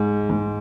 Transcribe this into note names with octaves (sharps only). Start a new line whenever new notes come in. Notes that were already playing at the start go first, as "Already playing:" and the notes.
Already playing: G#2
G#2